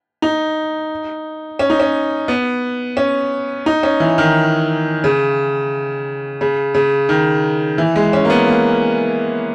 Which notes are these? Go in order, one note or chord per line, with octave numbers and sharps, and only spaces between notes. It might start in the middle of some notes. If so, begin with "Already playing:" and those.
D#4
C#4
D#4
C#4
B3
C#4
D#4
C#4
E3
D#3
C#3
C#3
C#3
D#3
E3
G#3
C#4
A#3
B3
A#3